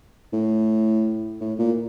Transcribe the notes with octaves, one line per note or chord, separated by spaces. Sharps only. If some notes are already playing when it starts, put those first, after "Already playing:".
A2
A2
A#2